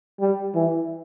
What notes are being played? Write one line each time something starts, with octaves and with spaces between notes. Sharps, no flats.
G3
E3